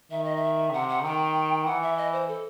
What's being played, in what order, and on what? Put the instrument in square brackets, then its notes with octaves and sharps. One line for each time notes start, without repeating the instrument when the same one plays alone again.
[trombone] D#3 [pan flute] E5
[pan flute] D#5
E5
[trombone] C3 [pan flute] F#5
[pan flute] F#5
[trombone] D#3 [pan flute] G5
[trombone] E3 [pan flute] F#5
[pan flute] E5
D#5
C5
A4